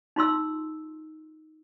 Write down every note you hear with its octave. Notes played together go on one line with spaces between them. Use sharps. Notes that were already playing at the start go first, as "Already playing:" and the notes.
D#4 F4 C6 E6